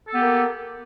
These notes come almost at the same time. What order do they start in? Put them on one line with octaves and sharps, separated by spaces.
A4 B3 G4 A#3